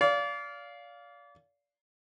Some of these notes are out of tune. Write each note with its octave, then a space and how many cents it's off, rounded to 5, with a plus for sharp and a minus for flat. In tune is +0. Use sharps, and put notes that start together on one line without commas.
D5 -30 F5 +0